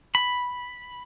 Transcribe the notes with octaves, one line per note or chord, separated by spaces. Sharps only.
B5